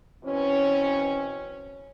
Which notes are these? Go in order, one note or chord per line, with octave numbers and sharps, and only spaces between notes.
B2 E3 C4 C#4